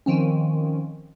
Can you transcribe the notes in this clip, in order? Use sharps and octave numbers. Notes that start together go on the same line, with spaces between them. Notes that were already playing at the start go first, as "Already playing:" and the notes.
D#3 F3 C4 C#4